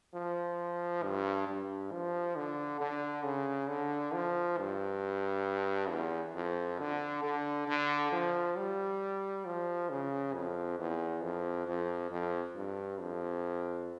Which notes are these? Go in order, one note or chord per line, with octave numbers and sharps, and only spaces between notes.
F3
G2
G2
F3
D3
D3
C#3
D3
F3
G2
E2
F2
D3
D3
D3
F3
G3
F3
C#3
F2
E2
F2
F2
F2
G2
F2